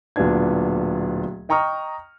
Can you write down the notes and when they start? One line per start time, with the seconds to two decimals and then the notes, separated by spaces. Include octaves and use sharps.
0.16 D1 A#2 B3 D4 G#6
1.49 D#5 G5 A#5 C#6 D#6 F6